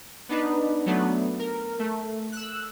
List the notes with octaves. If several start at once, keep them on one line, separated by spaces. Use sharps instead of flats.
B3 D4 D#4 B4
F#3 A3 B3 D4
A#4
A3
E6 F#6